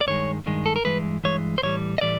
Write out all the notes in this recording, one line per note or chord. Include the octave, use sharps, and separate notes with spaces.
D5
G2 D#3 G#3 C#5
G2 D#3 G#3
A4
A#4
G2 E3 G#3 B4
G2 E3 G#3 C#5
C5
A2 E3 G3 C#5
D#5
A2 E3 G3 D5